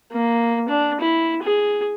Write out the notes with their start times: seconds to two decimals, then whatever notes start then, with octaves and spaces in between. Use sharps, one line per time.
0.12 A#3
0.68 D4
1.00 E4
1.43 G#4